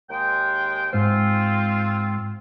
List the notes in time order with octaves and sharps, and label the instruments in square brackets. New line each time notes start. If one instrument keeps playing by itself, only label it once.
[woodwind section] D#2 G#3 G5
[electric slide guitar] G#2 C5 [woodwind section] C4 F4